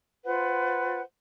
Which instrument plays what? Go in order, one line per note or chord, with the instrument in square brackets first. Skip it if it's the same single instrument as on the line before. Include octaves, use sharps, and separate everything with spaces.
[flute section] F4 B4 C5 F#5